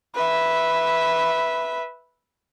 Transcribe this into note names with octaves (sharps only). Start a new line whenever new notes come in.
B4 E5